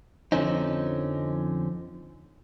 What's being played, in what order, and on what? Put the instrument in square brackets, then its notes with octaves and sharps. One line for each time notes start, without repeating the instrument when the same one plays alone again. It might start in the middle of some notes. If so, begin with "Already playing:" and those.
[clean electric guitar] F2 D3 F3 C4 C#4 D#4